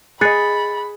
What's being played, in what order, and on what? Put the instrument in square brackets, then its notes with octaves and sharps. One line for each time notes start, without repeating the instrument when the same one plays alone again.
[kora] G#4 D#5 [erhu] B5 [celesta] F#6 A6 C#7